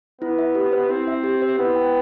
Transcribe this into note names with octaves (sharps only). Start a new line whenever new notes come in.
B3 E4
E5
G4
C5
C4 E4
E5
G4
C5
B3 E4
G5